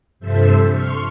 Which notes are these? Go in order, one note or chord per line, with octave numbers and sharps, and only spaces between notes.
G2 C3 F3 A4 C5 E5
C6 C#6 F6